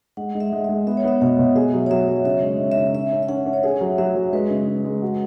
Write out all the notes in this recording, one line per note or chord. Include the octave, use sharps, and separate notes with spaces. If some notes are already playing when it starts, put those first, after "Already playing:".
G#3 F#5
G#3
E5
G#3
G#3 E5
B3 E5
C#5
B3 E5
B2 F#5
B2
G#4 E5
F#3
C#5
F#3 E5
F#3
C#3 E5
G#3
C#3
E5
C#3
C#4 E5
C#4
E5
C#4 F#5
C#4
C#5
G#4 E5
F#3
F#3 E5
F#3
G#3 B4
C#3
G#3
G#3
F#4